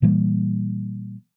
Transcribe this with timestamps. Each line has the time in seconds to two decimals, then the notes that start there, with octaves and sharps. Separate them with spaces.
0.02 A#2 E3 G3 A#3